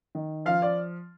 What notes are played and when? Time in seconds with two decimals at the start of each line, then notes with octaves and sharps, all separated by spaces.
0.15 D#3
0.46 F3 F5
0.62 D5